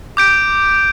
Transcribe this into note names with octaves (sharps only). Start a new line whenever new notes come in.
D6 G6 D7